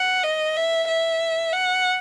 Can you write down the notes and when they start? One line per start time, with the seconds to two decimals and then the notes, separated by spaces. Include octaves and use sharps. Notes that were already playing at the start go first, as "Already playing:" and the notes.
Already playing: F#5
0.24 D#5
0.57 E5
0.88 E5
1.53 F#5